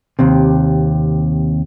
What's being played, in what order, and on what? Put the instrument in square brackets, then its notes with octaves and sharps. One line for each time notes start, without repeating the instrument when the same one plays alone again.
[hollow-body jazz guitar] D#2 C3